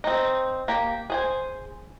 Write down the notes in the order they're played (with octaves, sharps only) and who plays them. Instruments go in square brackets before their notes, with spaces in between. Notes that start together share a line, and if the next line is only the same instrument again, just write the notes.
[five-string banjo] C4 D#4
A#3 G4
G#4 C5 G#5